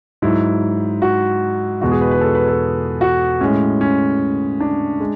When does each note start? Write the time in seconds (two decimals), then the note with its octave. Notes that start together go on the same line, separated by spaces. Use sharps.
0.22 G#2 F#3 E4
1.02 F#4
1.81 E2 B2 G#3 F#4
1.92 G#4
2.01 B4
2.11 B4
2.21 A4
2.35 B4
2.48 A4
3.01 F#4
3.41 A2 G#3 C#4
3.81 C#4
4.61 D4
5.00 G#3